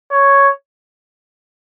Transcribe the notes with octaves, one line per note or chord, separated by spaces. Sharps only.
C#5